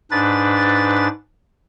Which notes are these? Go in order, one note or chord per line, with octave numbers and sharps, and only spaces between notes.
G#2 D4 B4 A6